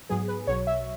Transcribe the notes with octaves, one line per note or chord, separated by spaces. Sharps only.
G#2 F#3 B3 G#4
B4
B1 B2 F#3 C#5
E5